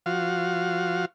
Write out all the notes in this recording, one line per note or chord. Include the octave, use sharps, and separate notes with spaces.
F3 F#4 F5